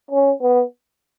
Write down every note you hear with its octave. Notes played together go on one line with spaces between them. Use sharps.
C#4
B3